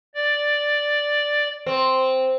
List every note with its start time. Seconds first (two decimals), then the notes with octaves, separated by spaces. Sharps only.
0.15 D5
1.67 C4